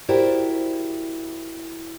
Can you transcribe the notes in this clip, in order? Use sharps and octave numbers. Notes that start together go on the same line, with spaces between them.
E4 F#4 G4 A#4 C5 D5